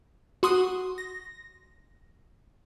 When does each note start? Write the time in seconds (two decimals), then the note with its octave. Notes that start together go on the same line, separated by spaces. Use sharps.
0.43 F#4 C6 D#6
0.98 A#6